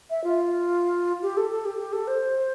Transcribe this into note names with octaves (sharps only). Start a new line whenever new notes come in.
E5
F4
G4
A4
A4
G4
G4
A4
C5